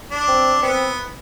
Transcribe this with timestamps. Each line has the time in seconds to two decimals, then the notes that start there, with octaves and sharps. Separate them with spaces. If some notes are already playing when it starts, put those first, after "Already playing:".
0.11 D4
0.28 C4
0.63 B3 C4